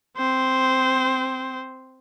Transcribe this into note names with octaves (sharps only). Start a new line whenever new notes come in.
C4 C5